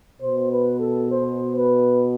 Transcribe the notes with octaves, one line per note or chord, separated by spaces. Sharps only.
B2 C5
B4
A4
C5
B4